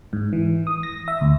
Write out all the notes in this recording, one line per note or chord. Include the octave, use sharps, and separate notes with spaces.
G#2
E3
D#6
A#6
E5
D2